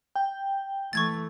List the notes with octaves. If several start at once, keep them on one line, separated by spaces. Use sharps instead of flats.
G5
E3 A3 C#6 G#6 A6